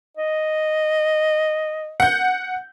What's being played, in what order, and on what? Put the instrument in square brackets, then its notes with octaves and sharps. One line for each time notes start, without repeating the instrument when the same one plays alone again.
[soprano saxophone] D#5
[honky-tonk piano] F#5 G6